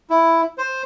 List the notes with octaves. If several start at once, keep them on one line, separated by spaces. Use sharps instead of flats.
E4
C5